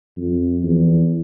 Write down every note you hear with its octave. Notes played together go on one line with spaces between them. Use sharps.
F2
E2